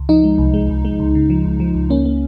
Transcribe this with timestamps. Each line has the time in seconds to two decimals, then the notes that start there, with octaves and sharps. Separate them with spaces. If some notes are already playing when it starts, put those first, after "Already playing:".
Already playing: C#2
0.09 F3 D#4
0.24 G#3
0.38 C2
0.54 G#3
0.70 C2
0.85 G#3
1.00 C#2
1.15 C#3
1.30 F3
1.45 C#2
1.60 F3
1.75 C#2
1.90 A#3 C#4
2.05 A#3